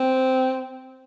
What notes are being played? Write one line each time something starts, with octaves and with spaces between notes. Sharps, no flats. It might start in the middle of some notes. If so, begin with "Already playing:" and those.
Already playing: C4